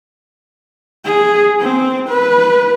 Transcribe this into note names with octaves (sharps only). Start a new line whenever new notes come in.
G#4
C4
B4